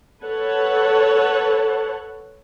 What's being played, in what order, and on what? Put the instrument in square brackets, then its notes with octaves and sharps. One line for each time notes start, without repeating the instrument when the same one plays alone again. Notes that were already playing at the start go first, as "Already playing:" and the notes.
[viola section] A4 B4 C#5 F#5 A5